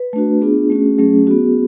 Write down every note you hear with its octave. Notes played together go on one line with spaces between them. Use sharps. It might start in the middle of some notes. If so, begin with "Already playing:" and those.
Already playing: B4
A3 D4 F#4
B3 D4 F4 G#4
A3 C#4 F#4
F#3 A3 C#4 G#4
B3 F#4